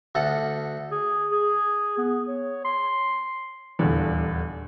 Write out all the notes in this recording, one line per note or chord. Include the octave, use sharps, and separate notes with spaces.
D2 A4 F#5
G#4
G#4
B3
C#5
C6
D#1 E2 D3